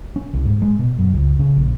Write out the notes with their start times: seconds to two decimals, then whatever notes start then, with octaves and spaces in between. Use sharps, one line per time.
0.16 C#4
0.33 C2
0.45 G#2
0.62 G#3
0.79 B2
0.99 F#2
1.13 C#2
1.39 C#3
1.57 A#1